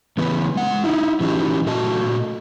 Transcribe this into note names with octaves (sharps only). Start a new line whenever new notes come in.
C#3 E3 B3 B4
G#3 F#5
D#4 E4
E3 G3 C#4 D#4 F#4 G4
A#2 A3 F#4 D#5 G#5 A5